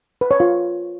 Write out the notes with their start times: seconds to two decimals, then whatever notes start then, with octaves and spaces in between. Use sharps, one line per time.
0.21 B4
0.31 C#5
0.40 F4